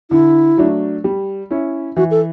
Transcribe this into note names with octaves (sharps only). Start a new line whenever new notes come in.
D3 E4
F#3 A3 D4
G3
C#4 E4
E3 F#4
A4